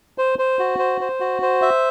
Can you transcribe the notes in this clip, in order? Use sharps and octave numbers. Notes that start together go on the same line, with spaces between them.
C5
C5
F#4
C5
C5
F#4
C5
E5